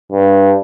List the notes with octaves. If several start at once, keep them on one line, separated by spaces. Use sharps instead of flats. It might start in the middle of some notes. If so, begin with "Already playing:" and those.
G2